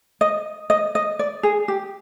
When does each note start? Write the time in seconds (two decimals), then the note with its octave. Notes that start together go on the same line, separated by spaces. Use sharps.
0.21 D#5
0.70 D#5
0.95 D#5
1.19 D5
1.43 G#4
1.68 G4